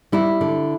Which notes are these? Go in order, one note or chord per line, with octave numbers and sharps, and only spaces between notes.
G3 E4
D3